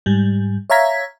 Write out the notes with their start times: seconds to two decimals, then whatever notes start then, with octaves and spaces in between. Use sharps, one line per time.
0.06 G#2 G3
0.70 C#5 E5 F5 A#5 G#6 B6